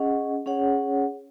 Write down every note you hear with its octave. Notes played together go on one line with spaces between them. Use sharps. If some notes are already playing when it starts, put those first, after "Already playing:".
Already playing: C#4 G#4 D#5 F#5
C#4 G#4 C#5 F#5